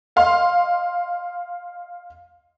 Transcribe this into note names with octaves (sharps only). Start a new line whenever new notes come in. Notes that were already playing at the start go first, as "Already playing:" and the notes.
D#5 F5 C6